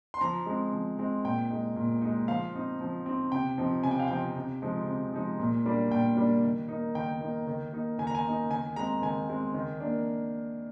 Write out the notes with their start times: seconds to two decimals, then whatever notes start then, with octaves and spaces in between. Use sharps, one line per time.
0.14 C6
0.21 F3 A#5
0.46 G#3 C4
0.73 F3
0.99 G#3 C4
1.24 A#2 G5
1.50 G#3 D#4
1.76 A#2
2.02 G#3 D#4
2.28 F3 F5
2.54 C4 D#4
2.81 F3
3.06 C4 D#4
3.32 C3 G5
3.58 F3 C4 D#4
3.83 C3 G#5
3.91 G5
4.00 F5
4.08 F3 C4 D#4 G5
4.36 C3
4.62 F3 G#3 D#4
4.87 C3
5.14 F3 G#3 D#4
5.39 A#2
5.65 G3 A#3 D4
5.91 A#2 G5
6.17 G3 A#3 D4
6.44 D#3
6.68 A#3 D#4
6.95 D#3 G5
7.21 A#3 D#4
7.47 D#3
7.73 A#3 D#4
7.98 D#3 G#5
8.07 A#5
8.15 G#5
8.25 A#3 D#4
8.51 D#3 G#5
8.76 G#3 C4 A#5
9.02 D#3 G#5
9.29 G#3 C4
9.54 D#3
9.80 A#3 D4